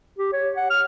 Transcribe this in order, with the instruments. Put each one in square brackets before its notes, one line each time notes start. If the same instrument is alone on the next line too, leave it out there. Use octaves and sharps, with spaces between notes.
[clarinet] G4
C#5
F#5
F6